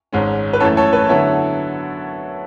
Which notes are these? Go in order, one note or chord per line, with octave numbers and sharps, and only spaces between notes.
G#1 G#2 G#3 C#4
B4
F#2 E3 A3 A4 C#5
A4 C#5
B4
D3 F#3 B3 E4 A4 C#5